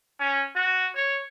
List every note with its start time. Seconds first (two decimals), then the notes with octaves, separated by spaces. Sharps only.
0.20 C#4
0.56 F#4
0.95 C#5